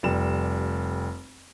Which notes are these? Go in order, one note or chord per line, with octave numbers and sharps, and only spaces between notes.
F1 G3 E7